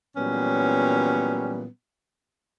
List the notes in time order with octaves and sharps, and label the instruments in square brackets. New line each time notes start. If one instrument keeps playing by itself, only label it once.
[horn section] A#2 E3 F#3 G3 B3 C#4